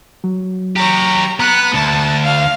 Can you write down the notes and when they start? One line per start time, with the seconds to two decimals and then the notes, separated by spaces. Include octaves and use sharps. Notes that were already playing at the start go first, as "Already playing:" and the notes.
0.24 F#3
0.76 G4 C#5 A#5
1.40 B3 A#5 F#6
1.74 D2 A5
2.24 F5